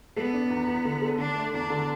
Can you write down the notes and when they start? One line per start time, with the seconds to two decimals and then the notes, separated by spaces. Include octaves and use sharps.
0.16 B3 A4
0.34 D4
0.50 E2
0.68 E2
0.85 D3
1.02 A4
1.18 D3 D4
1.36 A3
1.53 E2 D4
1.70 D3